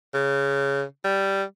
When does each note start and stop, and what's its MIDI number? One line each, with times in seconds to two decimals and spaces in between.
0.14 0.84 49
1.04 1.43 55